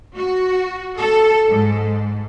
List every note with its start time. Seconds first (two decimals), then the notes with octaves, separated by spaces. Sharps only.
0.16 F#4
0.98 A4
1.47 G#2